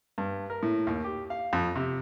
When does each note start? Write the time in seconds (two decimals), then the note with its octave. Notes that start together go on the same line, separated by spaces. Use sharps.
0.18 G2
0.50 A#4
0.63 A2
0.87 D#2
1.04 G4
1.30 F5
1.53 F2
1.76 C3